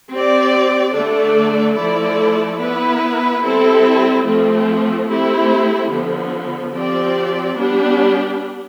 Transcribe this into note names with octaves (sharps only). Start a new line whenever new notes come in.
C4 G4 D5
D3 A3 D4 A4 D5
F3 A3 E4 A4 D5
B3 E4 B4
G3 C4 E4 A4
F3 A3 C4
A3 C4 E4 G4 C5
D3 F3 B3
F3 C4 G4 D5
G3 B3 D4 G4